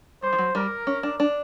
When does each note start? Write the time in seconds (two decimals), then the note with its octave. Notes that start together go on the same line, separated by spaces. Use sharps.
0.22 G3 C5
0.33 F3
0.38 F#3
0.55 G3 A#4
0.87 C#4
1.03 D4
1.20 D4